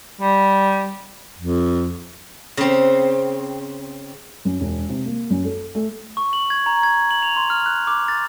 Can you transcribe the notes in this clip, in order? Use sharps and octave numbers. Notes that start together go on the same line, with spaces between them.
G3
F2
C#3 C4
F#2
E1
C3
A#3
F#2
A4
A3
C#6
F#7
G#6
A#5
G#6
F#7
F7
C6
F6
F#6
D6
A6